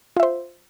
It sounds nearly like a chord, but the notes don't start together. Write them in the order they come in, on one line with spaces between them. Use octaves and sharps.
F4 E5 C5